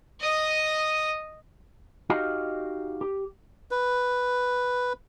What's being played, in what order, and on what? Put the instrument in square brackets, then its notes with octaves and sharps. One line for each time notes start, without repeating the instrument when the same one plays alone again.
[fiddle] D#5 D#6
[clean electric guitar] D#4 F#4 G4 D#5 F5
G4
[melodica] B4